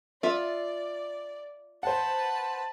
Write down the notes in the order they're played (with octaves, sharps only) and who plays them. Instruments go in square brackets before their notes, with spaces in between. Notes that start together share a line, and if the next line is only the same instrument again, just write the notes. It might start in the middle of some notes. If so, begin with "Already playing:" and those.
[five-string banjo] F4 E5 [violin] D5
[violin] B4 A5 [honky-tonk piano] C5 F#5